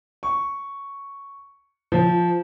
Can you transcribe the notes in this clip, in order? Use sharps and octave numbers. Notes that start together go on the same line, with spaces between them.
C#6
F3